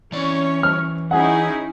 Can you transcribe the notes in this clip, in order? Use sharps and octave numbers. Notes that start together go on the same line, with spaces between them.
E3 C#4 C#5 D5
F6
C#4 D#4 E4 G#4 F#5